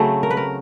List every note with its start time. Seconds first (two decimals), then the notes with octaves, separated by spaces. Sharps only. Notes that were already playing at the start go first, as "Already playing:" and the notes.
Already playing: C#3 F#3 A3 C4
0.23 A#4
0.30 B4
0.37 A#4